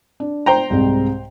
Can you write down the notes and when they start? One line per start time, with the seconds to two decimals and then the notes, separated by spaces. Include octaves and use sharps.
0.20 D4
0.46 C5 G5 A#5
0.70 C2 G#2 C4